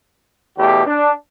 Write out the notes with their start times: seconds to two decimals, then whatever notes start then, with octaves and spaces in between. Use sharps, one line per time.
0.57 E2 B2 A3 G4
0.86 D4